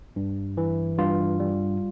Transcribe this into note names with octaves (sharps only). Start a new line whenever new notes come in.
G2
E3
G2 F4
G3